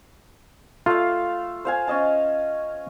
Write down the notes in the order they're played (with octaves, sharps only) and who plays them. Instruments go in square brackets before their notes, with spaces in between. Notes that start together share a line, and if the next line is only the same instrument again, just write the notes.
[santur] A3 F5 [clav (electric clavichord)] F4
[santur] C5 F5 G#5
C#4 D#5 A5